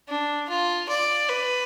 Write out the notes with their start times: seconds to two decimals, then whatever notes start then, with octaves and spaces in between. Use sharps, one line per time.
0.09 D4
0.49 F4
0.89 D5
1.29 B4